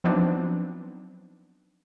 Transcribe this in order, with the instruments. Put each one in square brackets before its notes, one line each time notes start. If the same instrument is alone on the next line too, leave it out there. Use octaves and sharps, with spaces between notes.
[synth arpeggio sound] F3 F#3 B3 C4 D4 D#4